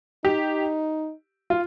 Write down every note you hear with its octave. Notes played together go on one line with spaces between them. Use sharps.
D#4 G4
F4